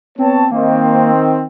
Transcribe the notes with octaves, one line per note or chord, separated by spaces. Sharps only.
B3 C4 C#5 A5
D#3 A#3 C4